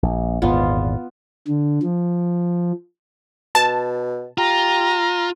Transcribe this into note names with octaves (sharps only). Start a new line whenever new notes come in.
A#1
G#1 E2 A#2 B3 F4
D3
F3
B2 A5
F4 G4 A#5